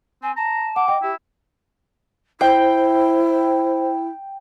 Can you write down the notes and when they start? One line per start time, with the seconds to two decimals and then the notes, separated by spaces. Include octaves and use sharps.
0.22 C4 G#5
0.36 A5 A#5
0.76 F#5 D6
0.88 D#5 G5
1.03 E4 G4
2.41 E4 C5 G5